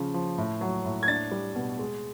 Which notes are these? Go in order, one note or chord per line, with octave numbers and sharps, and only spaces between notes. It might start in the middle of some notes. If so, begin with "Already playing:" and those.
Already playing: C#3 F3
F3
A2
F#3
A2
G#6
D4 A6
G3
B2
G#3